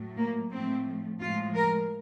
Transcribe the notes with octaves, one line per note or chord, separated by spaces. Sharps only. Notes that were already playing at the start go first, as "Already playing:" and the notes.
Already playing: A2 F#3 A3
A#3
A2 F3 A3 C4
A2 F3 G#3 F4
A#4